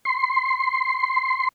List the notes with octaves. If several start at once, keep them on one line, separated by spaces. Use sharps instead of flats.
C6